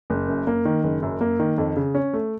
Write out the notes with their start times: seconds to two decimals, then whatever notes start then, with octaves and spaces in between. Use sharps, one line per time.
0.10 F#1
0.28 F#2
0.47 A#3
0.65 D#3
0.84 F#1
1.03 F#2
1.21 A#3
1.39 D#3
1.58 F2
1.76 C#3
1.95 C#4
2.13 A3